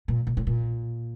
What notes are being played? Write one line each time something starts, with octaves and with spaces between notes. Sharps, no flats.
A#2
A#2
A2
A#2